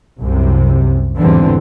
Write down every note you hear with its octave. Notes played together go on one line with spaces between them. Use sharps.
C2 F#2 C3
G#1 E2 D3 E3 G3 C4